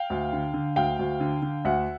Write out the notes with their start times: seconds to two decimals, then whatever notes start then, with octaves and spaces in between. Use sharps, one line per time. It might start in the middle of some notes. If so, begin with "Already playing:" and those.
Already playing: F5 G5
0.10 D2
0.33 D3
0.54 D3
0.76 D2 F5 G5
0.99 D2
1.20 D3
1.42 D3
1.65 D2 E5 F#5